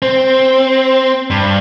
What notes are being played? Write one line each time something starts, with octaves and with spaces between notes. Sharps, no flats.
C4
G2